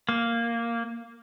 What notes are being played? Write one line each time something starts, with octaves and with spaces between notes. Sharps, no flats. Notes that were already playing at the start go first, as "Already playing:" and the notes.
A#3